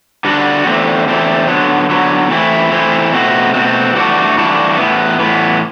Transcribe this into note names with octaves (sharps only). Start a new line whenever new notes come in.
D3 G3 D4 F#4
E2 D3 A3 C4
E2 D3 A3 C4
D3 F#3 B3
D3 F#3 B3
E3 A3 C4 E4
E3 A3 C4 E4
B2 A3 C4 F#4
B2 A3 C4 F#4
G2 E3 A3 D4 F#4
G2 E3 A3 D4 F#4
A2 E3 B3
A2 E3 B3